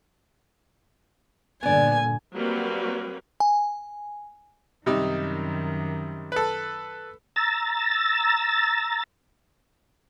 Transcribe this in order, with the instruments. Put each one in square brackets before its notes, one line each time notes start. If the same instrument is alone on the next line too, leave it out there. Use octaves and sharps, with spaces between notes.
[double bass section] G2 A#2 D3 [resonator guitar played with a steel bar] B3 D5 [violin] G#5
[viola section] F#3 G3 A#3 C4 F#4 B4
[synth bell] G#5
[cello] F#2 D#3 [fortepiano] C3 G3 D#4
[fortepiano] A4 B4
[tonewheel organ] A#5 E6 A6